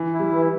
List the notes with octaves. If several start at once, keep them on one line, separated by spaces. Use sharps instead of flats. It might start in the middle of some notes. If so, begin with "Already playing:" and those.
Already playing: E3
E4
G3
E3